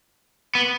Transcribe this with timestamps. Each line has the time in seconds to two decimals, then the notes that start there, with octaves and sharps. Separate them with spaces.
0.55 B3